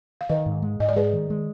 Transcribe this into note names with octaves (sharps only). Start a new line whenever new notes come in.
F5
D#3 B4 D#5
G#2
G#3
G#2 D#5
D5
G#3 G#4 B4
D#3
G#3